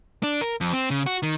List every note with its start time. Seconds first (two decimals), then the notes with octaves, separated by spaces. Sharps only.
0.23 D4
0.41 A#4
0.61 F2
0.73 C4
0.90 C#3
1.06 F#4
1.23 D#3